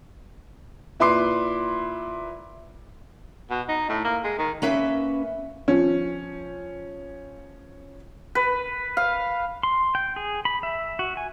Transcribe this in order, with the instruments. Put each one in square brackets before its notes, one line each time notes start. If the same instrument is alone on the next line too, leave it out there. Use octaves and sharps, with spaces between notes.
[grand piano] A#2 E4 B4 C6 D6 C7
[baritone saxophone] B2
D#4
A2
A#3
G#3
D#3
[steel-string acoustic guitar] A#3 C#4 B4 E5
[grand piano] F3 C#4
[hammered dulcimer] B4
F5
[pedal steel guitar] C6
G5
G#4
B5
E5
F#4
G#5